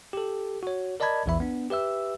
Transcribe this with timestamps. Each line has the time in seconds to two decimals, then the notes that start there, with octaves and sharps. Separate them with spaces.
0.13 G4 A4
0.63 F#4 C#5
1.00 A#4 D5 D#5 A5 B5 G#6
1.26 A#1 E2 E3 B3 E5 B5
1.40 B3 D4
1.70 G4 B4 E5 E6